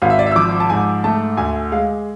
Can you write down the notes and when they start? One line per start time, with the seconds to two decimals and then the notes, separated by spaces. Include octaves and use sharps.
0.02 G#1 F5
0.10 E5
0.19 D5
0.26 E5
0.31 E6
0.36 F3 D6
0.60 A5
0.70 G#2 G#5
1.04 A3 A5
1.37 D2 G#5
1.72 G#3 F5